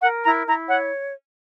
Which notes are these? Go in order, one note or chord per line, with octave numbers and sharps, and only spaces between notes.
A#4 F#5
E4 A#5
E4 A#5
C#5 F#5